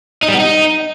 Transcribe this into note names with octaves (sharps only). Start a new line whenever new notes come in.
D#4
G3
B3
D#4